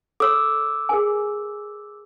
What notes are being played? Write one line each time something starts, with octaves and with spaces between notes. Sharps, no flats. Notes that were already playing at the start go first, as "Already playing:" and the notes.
A4 C#5 C6 D6 E6
G#4 A#4 G#5